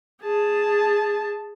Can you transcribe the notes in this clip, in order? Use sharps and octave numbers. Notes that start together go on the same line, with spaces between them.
G#4 A5